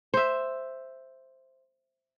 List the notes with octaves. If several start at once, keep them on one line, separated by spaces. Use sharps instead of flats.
C5 E5